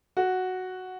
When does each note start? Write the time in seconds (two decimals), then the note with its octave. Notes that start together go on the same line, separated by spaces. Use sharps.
0.17 F#4